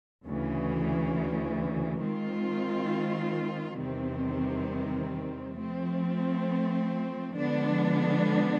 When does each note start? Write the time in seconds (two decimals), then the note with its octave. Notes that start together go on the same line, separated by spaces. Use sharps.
0.24 D2 C#3 E3
2.01 D#3 G#3 C4 F4
3.79 E2 C3 D#3 G3 C4
5.55 F3 A3 C4
7.33 D3 F3 G#3 B3 D4